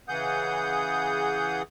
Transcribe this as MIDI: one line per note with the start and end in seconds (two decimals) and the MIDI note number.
0.08 1.62 49
0.08 1.62 52
0.08 1.62 68
0.08 1.62 78
0.08 1.62 87
0.08 1.62 91